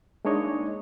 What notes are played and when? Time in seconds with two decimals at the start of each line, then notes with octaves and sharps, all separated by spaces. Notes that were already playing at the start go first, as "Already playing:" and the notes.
0.25 G#3 A#3 D4 D#4 C#5 D#5